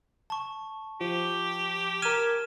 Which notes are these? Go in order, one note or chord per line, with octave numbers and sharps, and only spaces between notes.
A5 C#6
F3 G4
A#4 F6 G#6 D#7 E7